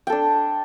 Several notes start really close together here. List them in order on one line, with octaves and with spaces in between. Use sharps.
G5 A4 D4